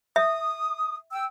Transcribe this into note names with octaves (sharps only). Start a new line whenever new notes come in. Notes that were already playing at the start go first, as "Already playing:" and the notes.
E5 D#6
G5 E6